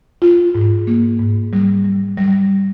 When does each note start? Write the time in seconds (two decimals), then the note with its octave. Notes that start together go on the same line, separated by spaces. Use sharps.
0.22 F4
0.55 G#2
0.87 A#3
1.20 G#2
1.53 G3
1.85 G3
2.17 G3